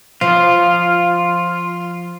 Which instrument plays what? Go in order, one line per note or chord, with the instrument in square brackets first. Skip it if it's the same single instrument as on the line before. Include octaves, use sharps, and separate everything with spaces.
[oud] F3 [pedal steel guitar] F4